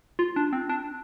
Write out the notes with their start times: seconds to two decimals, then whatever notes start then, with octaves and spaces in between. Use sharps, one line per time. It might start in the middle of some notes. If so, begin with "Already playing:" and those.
0.19 F4
0.36 D4
0.53 C4
0.69 D4